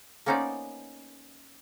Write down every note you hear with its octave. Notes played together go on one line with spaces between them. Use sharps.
A#3 B3 C#4 D#4 C5 D5